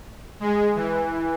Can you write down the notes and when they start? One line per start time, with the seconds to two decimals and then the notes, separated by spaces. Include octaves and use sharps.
0.40 G#3
0.75 E3